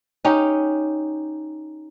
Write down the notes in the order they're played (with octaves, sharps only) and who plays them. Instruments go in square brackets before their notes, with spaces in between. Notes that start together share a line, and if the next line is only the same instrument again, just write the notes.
[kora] C#4 D#4 G4